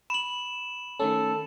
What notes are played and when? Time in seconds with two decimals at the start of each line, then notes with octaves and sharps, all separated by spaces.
0.10 B5 E7 F#7
1.00 D#3 A3 C#4 A4